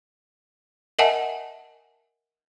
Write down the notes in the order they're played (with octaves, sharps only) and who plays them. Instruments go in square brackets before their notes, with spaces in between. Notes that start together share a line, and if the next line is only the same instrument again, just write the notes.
[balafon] A#4 D#5 E5 F#5 G#5 A5